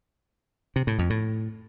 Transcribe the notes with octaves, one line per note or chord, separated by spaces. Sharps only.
C3
A2
F2
A2